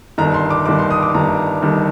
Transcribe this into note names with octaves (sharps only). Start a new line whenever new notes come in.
G1 G2 D#3 A#5
C6
D6
G1 G2 D#3 D6
C6
D#6
D6
G1 G2 D#3 A#5
G1 G2 D#3